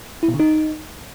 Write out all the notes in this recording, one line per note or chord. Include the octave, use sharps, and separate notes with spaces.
E4
B2
D3
D#4